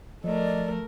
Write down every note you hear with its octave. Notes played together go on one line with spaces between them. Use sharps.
F3 A3 A#4 D5 D#5